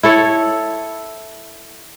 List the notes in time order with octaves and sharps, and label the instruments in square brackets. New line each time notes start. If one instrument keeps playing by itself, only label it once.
[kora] E4 A4 C#5